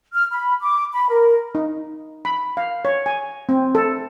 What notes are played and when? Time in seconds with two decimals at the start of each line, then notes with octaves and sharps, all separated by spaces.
0.13 F6
0.31 B5
0.62 D6
0.92 B5
1.09 A#4
1.55 D#4
2.25 B5
2.57 F5
2.85 C#5
3.06 G#5
3.49 C4
3.75 A4